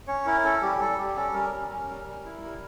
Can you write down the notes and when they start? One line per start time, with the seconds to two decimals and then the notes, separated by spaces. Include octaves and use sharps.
0.07 C#4 C#5
0.26 E4 A#4
0.44 C#4 A4
0.62 G3 G4
0.80 G3 A4
0.98 G3 G4
1.16 C#4 A4
1.34 G3 A#4
1.53 C#4
1.70 C#4
1.89 G3
2.07 G3
2.25 E4
2.43 G3